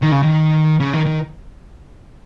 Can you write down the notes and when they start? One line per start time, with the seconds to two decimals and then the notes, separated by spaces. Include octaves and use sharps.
0.03 D#3
0.12 C#3
0.23 D#3
0.80 C#3
0.93 D#3
1.05 D#3